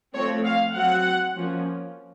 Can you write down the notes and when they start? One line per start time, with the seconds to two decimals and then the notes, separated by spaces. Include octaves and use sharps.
0.14 F3 A3 C4 C#5
0.45 F5
0.75 F#3 C4 F#5
1.37 F3 A#3 C#4